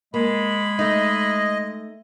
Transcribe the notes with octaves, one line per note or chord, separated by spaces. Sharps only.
G#3 A#3 B5
A3 D#4 D#5